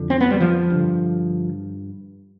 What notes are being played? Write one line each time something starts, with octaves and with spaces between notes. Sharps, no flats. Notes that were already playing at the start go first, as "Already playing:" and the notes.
Already playing: F2 D3
C4
B3
G3
F3
G2 D3